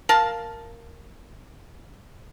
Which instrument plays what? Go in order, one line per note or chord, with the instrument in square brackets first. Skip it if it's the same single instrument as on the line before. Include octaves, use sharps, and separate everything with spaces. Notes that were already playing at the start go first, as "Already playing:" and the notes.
[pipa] A#4 F5 A5